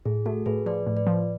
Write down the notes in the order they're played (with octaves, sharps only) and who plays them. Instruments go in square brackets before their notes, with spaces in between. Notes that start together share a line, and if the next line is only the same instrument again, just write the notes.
[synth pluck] A2 [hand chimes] G#4
[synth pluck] A3 [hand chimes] F#4 A4
[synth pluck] A2 [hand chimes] G#4 B4
[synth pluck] F3 [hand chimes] B4 D5
[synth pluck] A2
[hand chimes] B4 D5
[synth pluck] F3